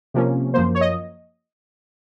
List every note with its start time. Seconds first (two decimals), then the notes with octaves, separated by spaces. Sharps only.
0.14 C3 F3 A#3 C#4
0.54 F#2 F3 A#3 C5
0.75 C#5
0.81 D#5